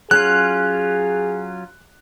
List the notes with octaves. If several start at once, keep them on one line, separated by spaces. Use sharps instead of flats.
F#3 C#4 F4 G#4 F#6